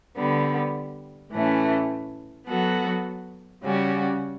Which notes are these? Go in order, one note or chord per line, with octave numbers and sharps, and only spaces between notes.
D3 G3 B3
A2 E3 A3 C#4
F#3 B3 F#4 A4
C#3 G3 C#4 F#4